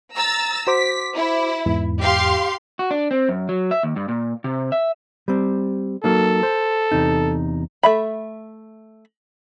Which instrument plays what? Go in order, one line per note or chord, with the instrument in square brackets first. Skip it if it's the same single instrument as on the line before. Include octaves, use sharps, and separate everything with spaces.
[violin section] A#5 E6 A6
[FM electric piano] F#4 C5 D6 [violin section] B6
[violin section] E4
[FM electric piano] E2 G#2 E3
[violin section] G4 F5 C6
[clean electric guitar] F#4
D4
C4
F#2
F#3
E5
D#2
G2
A#2
C3
E5
[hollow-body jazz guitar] G3 C4
[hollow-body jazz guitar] F#3 A#3 D#4 [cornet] A4
[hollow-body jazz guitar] C5
E2 C3 D#4
[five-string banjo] A3 E5 B5